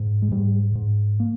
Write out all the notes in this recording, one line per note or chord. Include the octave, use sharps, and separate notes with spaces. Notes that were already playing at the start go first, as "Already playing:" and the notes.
Already playing: G#2
G#3
G#2 G3
G#2
A#3